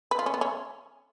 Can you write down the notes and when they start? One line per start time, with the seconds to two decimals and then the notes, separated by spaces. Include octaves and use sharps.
0.11 B4
0.19 F4
0.26 C#4
0.34 B3
0.41 C#4